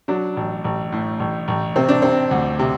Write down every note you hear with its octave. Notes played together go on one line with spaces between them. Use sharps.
F#3 D4
A1
A1
A2
A1
A1
C3 C4
D4
C3 C4
D2
C3